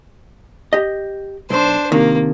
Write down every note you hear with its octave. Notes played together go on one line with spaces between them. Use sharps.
G4 D#5
B1 D4 C5 C6
C3 D#3 A#3